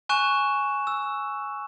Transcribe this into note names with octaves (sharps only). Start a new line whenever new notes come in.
G#5 C#6 F#6 E7
E6